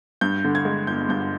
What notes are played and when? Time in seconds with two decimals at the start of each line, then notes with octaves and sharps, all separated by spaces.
0.21 G2 G6
0.44 D3
0.55 G#6
0.65 G#3
0.87 G1 G6
1.09 G2 G6